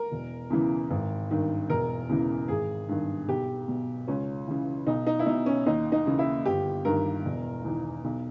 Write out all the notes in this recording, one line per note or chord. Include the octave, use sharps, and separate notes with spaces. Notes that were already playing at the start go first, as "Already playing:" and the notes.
Already playing: A#4
E1
E2 C#3 E3
G#1
G2 D#3
E1 A#4
E2 C#3 E3
G#1 G#4
G2 D#3
B1 G4
B2
C#2 C#4
C#3 E3
B1 D#4
D#4
E4
B2 D#4
C#4
D#2 D#4
D#4
C#3 E3
E4
G1 G4
G2 D#3 A#4
E1
E2 D#3
B1